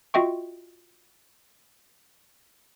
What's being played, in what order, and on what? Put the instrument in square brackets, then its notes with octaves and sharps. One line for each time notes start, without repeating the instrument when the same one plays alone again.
[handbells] F4 F#4 D#5 E5 G5 C#6